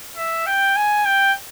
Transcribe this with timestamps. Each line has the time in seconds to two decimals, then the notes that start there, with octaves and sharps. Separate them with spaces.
0.16 E5
0.46 G5
0.76 G#5
1.05 G5